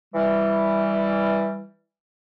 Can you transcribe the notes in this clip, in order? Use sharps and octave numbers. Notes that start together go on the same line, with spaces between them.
E3 G3